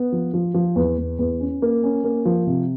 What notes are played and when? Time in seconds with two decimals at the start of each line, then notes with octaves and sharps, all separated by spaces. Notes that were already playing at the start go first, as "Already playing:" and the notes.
Already playing: B3
0.12 F3
0.34 F3
0.54 F3
0.76 E2
0.98 E2
1.19 E2
1.40 C#4
1.62 A#3
1.83 C#4
2.04 A#3
2.25 F3
2.47 C3